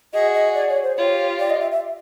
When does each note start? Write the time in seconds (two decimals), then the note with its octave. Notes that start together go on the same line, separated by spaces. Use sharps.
0.13 F#4 G#4 D#5
0.34 D#5
0.55 D5
0.69 C#5
0.83 C5
0.97 F4 G4 C#5
1.39 D5
1.50 D#5
1.61 E5
1.71 E5